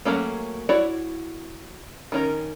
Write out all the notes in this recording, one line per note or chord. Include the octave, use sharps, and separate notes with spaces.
F#3 A3 A#3 C#4
E4 F#4 C#5 D5
D#3 C#4 A#4